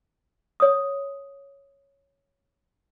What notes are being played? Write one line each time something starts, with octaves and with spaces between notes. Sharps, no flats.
C#5 D#6